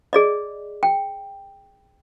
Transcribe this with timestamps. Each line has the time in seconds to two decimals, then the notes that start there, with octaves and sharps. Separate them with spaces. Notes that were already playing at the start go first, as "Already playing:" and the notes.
0.13 G#4 D5 D#5
0.83 G5